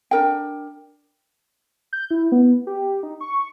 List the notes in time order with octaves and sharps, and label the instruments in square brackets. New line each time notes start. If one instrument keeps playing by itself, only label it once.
[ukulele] D4 A#4 G5
[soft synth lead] G6
E4
B3
G4
D#4
C#6